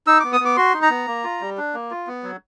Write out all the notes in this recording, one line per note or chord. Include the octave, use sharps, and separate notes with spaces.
D#4 E6
B3 D6
D#6
B3 D6
F#4 C6
D#4
A#5
B3
A#3
F4
G3
D4
A#3
F4
B3
F#3